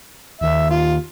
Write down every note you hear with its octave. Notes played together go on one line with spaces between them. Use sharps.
D#2 E5
F4